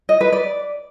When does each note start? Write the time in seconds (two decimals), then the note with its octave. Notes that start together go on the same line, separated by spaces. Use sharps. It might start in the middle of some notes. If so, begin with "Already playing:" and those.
0.09 D#5
0.21 B4
0.32 D5